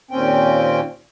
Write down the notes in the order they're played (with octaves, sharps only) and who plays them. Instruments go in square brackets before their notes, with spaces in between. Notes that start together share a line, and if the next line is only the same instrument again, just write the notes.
[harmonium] D#2 A#2 C4 C#4 G5